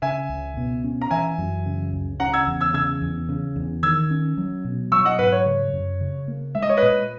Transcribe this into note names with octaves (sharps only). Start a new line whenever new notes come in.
C#3 E5 G#5
C#2
B2
C#4
A#5
E3 E5 G#5
F#2
C#3
C#2
C#3 F#5 A#5
E6 G#6
E2
E6 G#6
C#3 E6 G#6
E2
C#3
E2
D#3 E6 G#6
C#4
F#3
B2
F#3 C#6 E6
D#5 F#5
G#2 B4
C#5
C#3
F#2
C#3
A#3
G#3 E5
D#5
C#5
B4 D#5
A#2